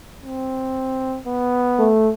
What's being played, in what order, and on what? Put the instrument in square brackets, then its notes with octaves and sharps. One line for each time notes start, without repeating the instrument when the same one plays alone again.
[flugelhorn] C4
B3
[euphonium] A3